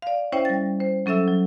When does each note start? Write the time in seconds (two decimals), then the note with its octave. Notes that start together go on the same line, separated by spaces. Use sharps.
0.02 D5 F5
0.32 C#4 E4 C5 C#5 E5 G5
0.45 G3 A6
0.80 C5
1.06 F#3 C#4 A4 E5 E6
1.27 F#3